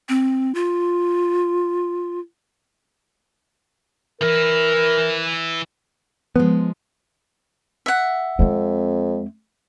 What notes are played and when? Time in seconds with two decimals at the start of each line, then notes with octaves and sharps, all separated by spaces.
0.09 C4
0.55 F4
4.21 E3 E4 A#4
6.36 F3 G#3 B3
7.86 E5 F#5
8.39 F2 G#3 C4